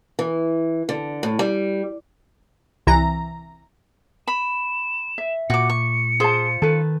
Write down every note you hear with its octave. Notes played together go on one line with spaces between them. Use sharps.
E3
D3
A2
G3
C2 E3 A#5
B5 E7
E5
A#2 F#4 D6 C#7
C#6
F4 G#4 C5 A5
D#3 A4 B4